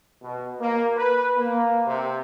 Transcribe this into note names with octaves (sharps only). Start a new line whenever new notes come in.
B2
A#3
B4
A#3
C3